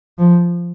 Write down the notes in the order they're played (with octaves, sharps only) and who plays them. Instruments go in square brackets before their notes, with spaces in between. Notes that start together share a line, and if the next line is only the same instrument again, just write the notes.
[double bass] F3